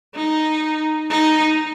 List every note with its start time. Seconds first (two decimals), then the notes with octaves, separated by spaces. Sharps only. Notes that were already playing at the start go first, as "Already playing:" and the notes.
0.15 D#4
1.10 D#4